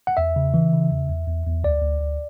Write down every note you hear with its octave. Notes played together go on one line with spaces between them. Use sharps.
F#5
E2 E5
C#3
E3
C#3
E2
E2
E2
E2
D2 D5
D2
D2